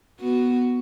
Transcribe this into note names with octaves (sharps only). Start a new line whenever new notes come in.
B3 F#4